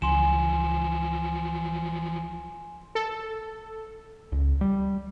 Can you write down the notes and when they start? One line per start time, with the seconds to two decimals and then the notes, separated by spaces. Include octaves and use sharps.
0.02 C#2 E3 F3 G#5 C6 E7
2.95 A4
4.32 C#2
4.61 G3